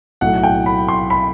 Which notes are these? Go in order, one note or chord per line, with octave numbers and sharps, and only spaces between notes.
B1 A2 F#3 A3 F#5
G5
B5
C6
B5